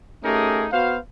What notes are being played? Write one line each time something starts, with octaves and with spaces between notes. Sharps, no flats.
A3 C#4 D#4 G4 G#4 A#4
B3 F#4 C5 F5